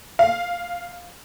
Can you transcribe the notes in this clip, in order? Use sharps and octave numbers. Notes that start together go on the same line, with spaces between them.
F5